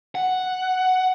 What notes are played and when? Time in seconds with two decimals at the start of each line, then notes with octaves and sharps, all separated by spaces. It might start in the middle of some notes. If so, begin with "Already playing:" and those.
0.15 F#5